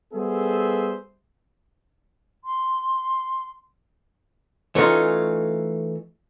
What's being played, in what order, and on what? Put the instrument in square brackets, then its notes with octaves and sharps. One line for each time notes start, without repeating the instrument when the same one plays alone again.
[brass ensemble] G3 B3 G#4 A4 C5 E5
[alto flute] C6
[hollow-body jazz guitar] E3 A3 C#4 D#4 F4